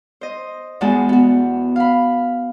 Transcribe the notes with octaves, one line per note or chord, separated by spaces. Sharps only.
C5 D#5
E2 G#3 F#4 A5
B3 F#4
F5 B5